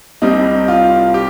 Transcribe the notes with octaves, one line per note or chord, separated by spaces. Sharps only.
C2 C3 G3 C4 D#4
F4
G4